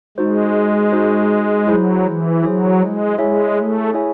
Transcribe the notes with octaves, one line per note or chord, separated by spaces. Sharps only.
G#3 D#4 F#4 C5
D#4 F#4 C5
F#3 E4 G#4 C5
E3
F#3 E4 G#4 C5
G#3
G#3 E4 G#4 C#5 E5 G#5
A3
E4 G#4 C#5 E5 G#5